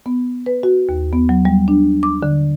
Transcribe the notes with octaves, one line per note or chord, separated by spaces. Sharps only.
B3
B4
F#4
D#2
B3
F#3
G3
D4
D6
D3